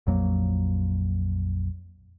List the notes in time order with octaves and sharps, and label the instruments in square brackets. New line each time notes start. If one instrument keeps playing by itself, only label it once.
[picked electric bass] A#1 F2 F#3 A#3